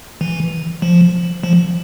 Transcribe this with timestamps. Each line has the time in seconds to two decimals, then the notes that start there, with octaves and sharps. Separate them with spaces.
0.21 E3
0.82 F3
1.43 F3